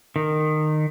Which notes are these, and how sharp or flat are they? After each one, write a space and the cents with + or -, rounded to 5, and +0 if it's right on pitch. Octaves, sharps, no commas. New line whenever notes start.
D#3 -20